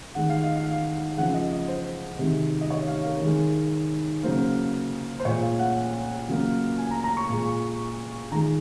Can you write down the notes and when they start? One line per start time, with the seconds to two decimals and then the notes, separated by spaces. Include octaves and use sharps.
0.15 D#3 G#3 F#5
0.30 F5
0.43 D#5
0.56 F5
1.17 C#3 F3 G#3 F#5
1.34 D#5
1.52 D#5
1.68 C5
2.19 C3 D#3 G#3
2.61 D#5
2.70 C#5
2.88 F5
3.05 A#4
3.21 D#3 G#3
4.23 C#3 F#3 A#3 C5
5.20 C5
5.25 A#2 G#3 C#5
5.43 F5
5.59 F#5
6.28 C#3 F#3 A#3
6.78 G#5
6.91 A#5
7.04 A#5
7.17 C#6
7.30 A#2 G#3
8.32 D#3 A#5
8.35 G#3